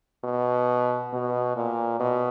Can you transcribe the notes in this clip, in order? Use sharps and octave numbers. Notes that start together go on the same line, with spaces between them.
B2
B2
A#2
B2